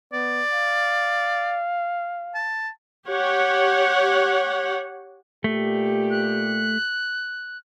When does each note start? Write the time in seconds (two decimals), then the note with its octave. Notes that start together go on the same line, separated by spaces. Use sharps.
0.13 B3 D5
0.52 F5
2.35 A5
3.08 G4 C#5 F#5
5.44 A#2 A3 G4
6.10 F#6